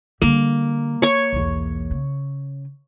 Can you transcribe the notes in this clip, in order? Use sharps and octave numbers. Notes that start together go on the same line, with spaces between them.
D3 G3 A#3
C#5 C#6
B1 E2
C#3